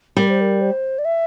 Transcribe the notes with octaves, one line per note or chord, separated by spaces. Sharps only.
G3 A#4
C5
A#4
C5
D5
E5